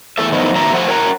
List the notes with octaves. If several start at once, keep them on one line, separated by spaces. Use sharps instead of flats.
E2 A4 E5
D#3 F3 B3 D#4 E4
D#3 F#3 A3 B3 E5 A#5
F3 A3 F#5
A#4 C#5 F#5 G5 A#5